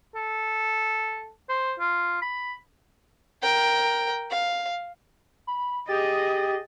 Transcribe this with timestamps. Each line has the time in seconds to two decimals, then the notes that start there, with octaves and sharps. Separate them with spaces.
0.15 A4
1.49 C5
1.80 F4
2.22 B5
3.42 A#4 G5
4.31 F5
5.47 B5
5.89 G4 G#4 D#5 A6